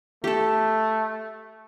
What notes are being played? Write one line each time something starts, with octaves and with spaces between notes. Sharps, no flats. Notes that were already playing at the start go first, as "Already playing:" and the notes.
A3 G4 A4